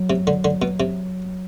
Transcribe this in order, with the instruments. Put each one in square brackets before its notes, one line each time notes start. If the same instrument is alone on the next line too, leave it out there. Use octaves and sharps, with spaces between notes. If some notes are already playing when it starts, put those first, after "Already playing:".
Already playing: [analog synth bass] F#3
[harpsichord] C3
D3
D3
B2
C3